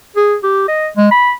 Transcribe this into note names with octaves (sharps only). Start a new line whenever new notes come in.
G#4
G4
D#5
G#3
B5